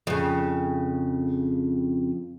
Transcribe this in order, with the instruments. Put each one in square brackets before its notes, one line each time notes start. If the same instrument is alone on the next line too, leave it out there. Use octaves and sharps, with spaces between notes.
[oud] F2 C#3